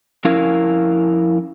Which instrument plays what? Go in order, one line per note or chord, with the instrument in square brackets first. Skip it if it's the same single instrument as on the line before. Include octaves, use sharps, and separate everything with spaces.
[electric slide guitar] F2 C#4 E4 A#4 F5